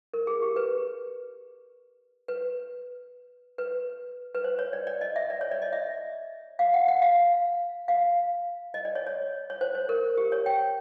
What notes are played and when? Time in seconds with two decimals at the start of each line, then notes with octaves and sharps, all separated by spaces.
0.14 A#4
0.27 G#4
0.42 G4
0.56 B4
2.28 B4
3.58 B4
4.35 B4
4.44 C5
4.59 C#5
4.73 D5
4.87 D5
5.01 D#5
5.16 E5
5.30 D5
5.41 C#5
5.51 D5
5.62 D#5
5.73 E5
6.59 F5
6.74 F#5
6.88 F#5
7.02 F5
7.88 F5
8.74 D#5
8.85 D5
8.95 C#5
9.07 C#5
9.50 C#5
9.61 C5
9.75 C5
9.89 A#4
10.17 G4
10.32 C#5
10.46 G5